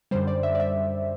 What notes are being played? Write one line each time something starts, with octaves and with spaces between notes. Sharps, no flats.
F#2 D3 G3 C5
D5
E5
D5
E5